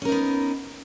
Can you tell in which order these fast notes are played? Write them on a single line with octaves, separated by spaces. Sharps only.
C#4 A#4 D#4 B3